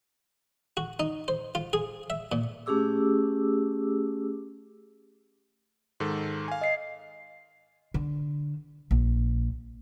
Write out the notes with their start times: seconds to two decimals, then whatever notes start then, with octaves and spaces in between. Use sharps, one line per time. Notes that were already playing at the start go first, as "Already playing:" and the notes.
0.77 F#4
1.00 D#4
1.28 C5
1.55 F4
1.73 G#4
2.10 E5
2.32 A#2
2.66 A3 C#4 G4 G#4 D6 E6
6.00 G#2 D#3 A4
6.48 F5 G#5
6.61 D#5 C7
7.94 D3
8.91 A#1